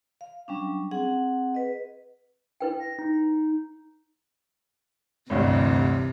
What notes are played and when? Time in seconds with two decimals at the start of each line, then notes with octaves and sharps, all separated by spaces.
0.21 F5
0.48 F#3 G3 C#4 D4
0.91 C4 G#4 F#5
1.54 B4 D#5
2.60 E4 B4 G5
2.80 A#6
2.99 D#4
5.30 A1 D2 G2 C3 E3